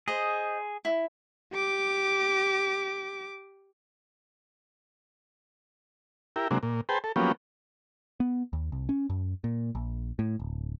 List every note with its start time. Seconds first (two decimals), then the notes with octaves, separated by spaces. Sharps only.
0.08 G#4 C5 D#5
0.85 E4
1.53 G4 D6
6.36 E4 G4 A#4
6.51 C3 F#3 G#3 A#3 D4
6.63 A#2
6.89 G#4 B4 C5 G5 A5
7.04 A4
7.16 F3 F#3 A#3 B3 C#4 G4
8.20 B3
8.53 D#2
8.72 C2
8.89 C#4
9.10 F#2
9.44 A#2
9.75 A#1
10.19 A2
10.40 D1